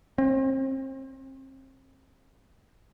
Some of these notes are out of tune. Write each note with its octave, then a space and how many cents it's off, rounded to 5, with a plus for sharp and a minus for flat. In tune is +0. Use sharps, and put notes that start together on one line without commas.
C4 +35